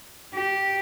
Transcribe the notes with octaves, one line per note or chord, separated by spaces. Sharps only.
G4